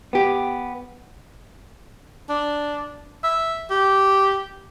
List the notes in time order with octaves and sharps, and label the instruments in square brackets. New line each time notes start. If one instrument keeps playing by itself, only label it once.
[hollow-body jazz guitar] B3 G4
[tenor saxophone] D4
E5
G4